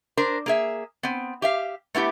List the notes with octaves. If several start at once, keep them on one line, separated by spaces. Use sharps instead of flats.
D4 A#4 C5
A#3 G#4 E5
B3 C4
G4 E5 F5
A3 B3 E4 G4